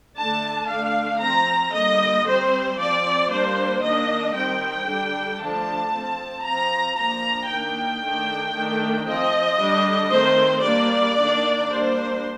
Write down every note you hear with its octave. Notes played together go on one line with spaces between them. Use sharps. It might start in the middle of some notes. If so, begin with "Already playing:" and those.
D3 A3 D4 A5
D3 A3 D4 F5
C4 A#5
F3
D3 G3 A#3 D#5
G3 C4 C5
F3 C4 D5
G3 A#3 D4 C5
D#3 A#3 D4 D#5
D#3 G3 C4 G5
D3 G3 D4
D3 F3 A3 D4 A5
F3 C4
F3 C4 A#5
F3 A#3 D4 A#5
D#3 A#3 D4 G5
D#3 A3 D4
D#3 A3 D4
F3 C4 D#5
D3 G3 D4
D#3 A3 C4 C5
G3 A#3 D4 D5
D#3 A#3 D4
G3 A#3 D4 C5